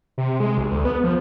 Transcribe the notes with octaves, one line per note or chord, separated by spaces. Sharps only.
C3
G#3
B1
D2
B3
F3